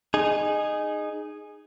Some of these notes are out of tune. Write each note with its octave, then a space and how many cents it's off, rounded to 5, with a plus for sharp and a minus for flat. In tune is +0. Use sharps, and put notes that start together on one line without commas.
D#4 -15 G#4 +0